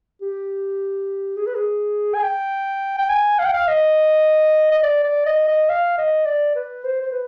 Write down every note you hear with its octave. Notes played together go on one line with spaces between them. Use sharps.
G4
G#4
B4
G#4
G#5
G5
G5
G#5
F5
G5
F5
D#5
D#5
D5
D5
D#5
D#5
F5
D#5
D5
B4
C5
C5
B4